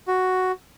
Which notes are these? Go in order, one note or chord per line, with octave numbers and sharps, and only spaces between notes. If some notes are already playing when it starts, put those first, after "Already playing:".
F#4